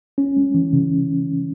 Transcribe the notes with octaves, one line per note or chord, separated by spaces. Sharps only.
C#4
G#3
E3
C#3